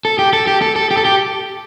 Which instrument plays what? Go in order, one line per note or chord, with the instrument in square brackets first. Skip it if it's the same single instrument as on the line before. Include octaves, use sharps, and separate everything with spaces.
[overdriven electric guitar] A4
G4
A4
G4
A4
A4
G4
A4
G4